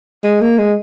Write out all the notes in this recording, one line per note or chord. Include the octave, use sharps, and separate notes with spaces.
G#3
A#3
G#3